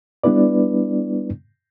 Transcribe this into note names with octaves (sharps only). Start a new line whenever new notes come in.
G3 B3 D4 E4 B4 D5